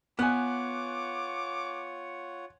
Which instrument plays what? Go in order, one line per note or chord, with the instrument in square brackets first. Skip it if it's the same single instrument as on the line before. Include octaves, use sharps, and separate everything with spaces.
[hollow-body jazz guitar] B3 [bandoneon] F4 C#5 F#5 [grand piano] G#5 F#6 [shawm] D6